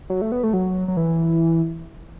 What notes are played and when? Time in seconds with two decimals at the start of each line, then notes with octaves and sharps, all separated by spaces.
0.10 F#3
0.21 A3
0.32 B3
0.43 A3
0.53 F#3
0.88 F#3
0.97 E3